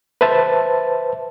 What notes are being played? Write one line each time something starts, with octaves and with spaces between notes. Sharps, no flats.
B4 C5 E5 A5